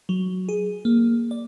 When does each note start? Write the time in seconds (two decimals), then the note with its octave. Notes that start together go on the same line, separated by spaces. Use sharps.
0.09 F#3
0.49 G#4
0.85 A#3
1.31 D5